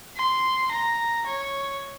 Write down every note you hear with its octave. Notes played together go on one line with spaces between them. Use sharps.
C6
A#5
C#5